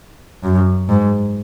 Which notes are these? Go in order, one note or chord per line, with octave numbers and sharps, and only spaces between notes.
F#2
G#2